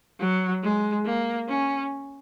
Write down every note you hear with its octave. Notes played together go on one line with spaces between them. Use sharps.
F#3
G#3
A#3
C#4